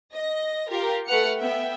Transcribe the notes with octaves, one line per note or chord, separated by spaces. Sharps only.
D#5 A#6
F4 G4 A#4
A3 B4 F#5 F6 C#7
B3 E5 G5